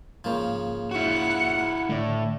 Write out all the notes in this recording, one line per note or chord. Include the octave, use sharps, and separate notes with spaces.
G#2 C#3 F3 A#3
E4 F#4 F#5
A2 D3 D5